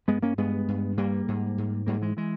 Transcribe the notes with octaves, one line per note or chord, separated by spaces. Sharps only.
G2 G#3 B3
A#3 C#4
G2 G#3 B3
G2
G2 G3 A#3
G#2
G#2
G#2 G3 A#3
E3 G#3
E3 G#3